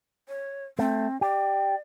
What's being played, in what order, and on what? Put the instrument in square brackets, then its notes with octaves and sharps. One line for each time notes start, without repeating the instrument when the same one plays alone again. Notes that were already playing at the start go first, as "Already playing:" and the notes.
[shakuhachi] C#5
[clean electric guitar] A3 [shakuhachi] C4
[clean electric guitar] G4 [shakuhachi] D5